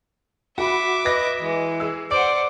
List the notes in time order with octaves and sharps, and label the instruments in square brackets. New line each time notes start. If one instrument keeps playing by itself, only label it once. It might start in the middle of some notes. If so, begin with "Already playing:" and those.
[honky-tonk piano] F#4 B5 [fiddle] E5 D6
[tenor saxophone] B4 [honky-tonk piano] D#5 A#6
[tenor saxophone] E3 [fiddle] G#3
[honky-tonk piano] G#4 E6
[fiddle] C5 F#5 [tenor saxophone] D5 [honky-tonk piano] D7